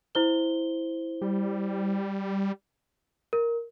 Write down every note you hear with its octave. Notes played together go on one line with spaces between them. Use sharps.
E4 C5 G7
G3
A#4